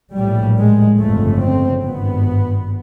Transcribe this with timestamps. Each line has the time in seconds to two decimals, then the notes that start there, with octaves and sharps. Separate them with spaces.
0.15 A#1 A2 G3
0.57 G#3
0.99 G1 F2 C#3 A3
1.42 C4
1.83 G#1 G2 B3